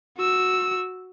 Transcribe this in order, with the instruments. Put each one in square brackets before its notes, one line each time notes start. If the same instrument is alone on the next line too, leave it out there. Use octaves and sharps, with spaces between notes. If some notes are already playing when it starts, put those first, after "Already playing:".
[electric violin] F#4 E6